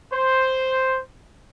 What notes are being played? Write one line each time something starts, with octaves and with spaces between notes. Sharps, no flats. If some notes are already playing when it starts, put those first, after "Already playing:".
C5